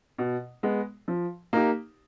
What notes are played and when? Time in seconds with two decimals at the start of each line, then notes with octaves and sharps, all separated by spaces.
0.18 B2
0.63 G#3 B3
1.08 F3
1.53 A#3 D#4 G4